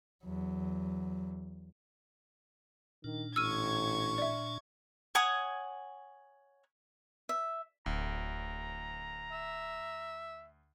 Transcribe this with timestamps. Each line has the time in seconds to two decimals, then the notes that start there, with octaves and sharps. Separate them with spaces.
0.24 E2 F#3
3.04 A#2 D#3 D4
3.36 A1 C#6 E6 F6 G#6 D#7
4.18 D5 E5
5.15 C#5 F#5 G#5 D#6
7.29 E5
7.86 D1 D2 A#5
9.32 E5